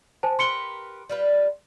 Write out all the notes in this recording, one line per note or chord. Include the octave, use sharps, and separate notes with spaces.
C5 G#5 A5
G4 A#4 B4 C6 C#7 G7
G3 F4 B4